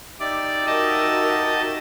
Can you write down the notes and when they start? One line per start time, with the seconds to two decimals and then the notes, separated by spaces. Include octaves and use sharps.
0.20 D#4 G4 D5 E5
0.66 F#4 A#4 D#5 A5